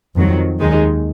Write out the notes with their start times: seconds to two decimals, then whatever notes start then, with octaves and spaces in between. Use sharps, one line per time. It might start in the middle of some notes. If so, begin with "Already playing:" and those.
0.16 F2 D#3 F#3
0.60 D#2 D#3 G#3 D#4